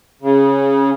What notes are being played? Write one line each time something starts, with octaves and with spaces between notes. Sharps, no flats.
C#3